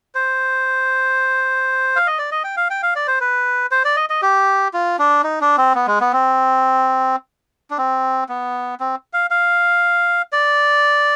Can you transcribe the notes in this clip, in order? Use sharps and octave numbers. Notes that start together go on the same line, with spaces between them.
C5
F5
D#5
D5
D#5
G5
F5
G5
F5
D5
C5
B4
C5
D5
D#5
D#5
G4
F4
D4
D#4
D4
C4
B3
G#3
B3
C4
D4
C4
B3
C4
F5
F5
D5